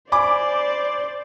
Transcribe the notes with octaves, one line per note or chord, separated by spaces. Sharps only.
C5 D5 G#5 B5 D6